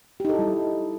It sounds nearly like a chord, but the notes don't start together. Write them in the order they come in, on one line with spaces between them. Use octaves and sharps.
G4 D#4 A4 E4 G3